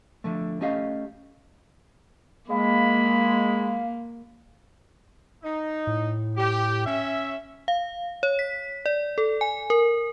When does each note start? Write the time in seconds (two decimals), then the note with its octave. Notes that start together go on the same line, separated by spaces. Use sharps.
0.24 D3 F3 A3
0.61 A3 C#4 G4 D#5 F5
2.50 G#3 A#3 F5 B5
5.43 D#4
5.87 A2
6.37 G4
6.86 C#4 E5
7.68 F5
8.23 C#5
8.39 B6
8.86 D5
9.18 A4
9.41 G#5
9.70 A#4